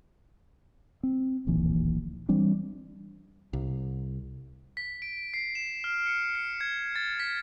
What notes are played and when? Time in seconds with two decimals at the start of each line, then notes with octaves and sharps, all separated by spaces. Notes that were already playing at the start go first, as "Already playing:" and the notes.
1.03 C4
1.47 D1 A#1 D#2 E3
2.29 E3 G3 C4 D4
3.53 C2
4.77 B6
5.02 D7
5.34 C7
5.55 E7
5.84 F6
6.06 C#7
6.35 C#7
6.61 G#6
6.96 A6
7.20 B6